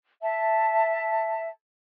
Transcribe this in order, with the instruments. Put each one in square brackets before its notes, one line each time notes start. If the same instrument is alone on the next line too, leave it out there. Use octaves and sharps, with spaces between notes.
[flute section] E5 A5